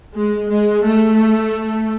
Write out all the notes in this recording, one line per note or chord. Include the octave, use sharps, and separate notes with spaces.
G#3
G#3
A3